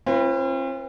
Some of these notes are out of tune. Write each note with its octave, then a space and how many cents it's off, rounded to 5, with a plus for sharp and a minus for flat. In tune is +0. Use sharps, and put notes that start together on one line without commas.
C4 +40 F4 -40 B4 +0